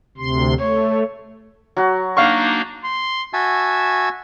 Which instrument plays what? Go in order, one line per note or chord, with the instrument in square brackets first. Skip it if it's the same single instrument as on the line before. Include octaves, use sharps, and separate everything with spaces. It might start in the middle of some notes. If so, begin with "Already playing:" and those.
[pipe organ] D2 C3 C6
[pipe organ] A3 [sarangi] C#5
[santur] F#3 F#4
[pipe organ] A#3 D4 D#4 [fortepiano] F5 C#6
[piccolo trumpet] C6
[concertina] F#4 E5 G#5 A5 E6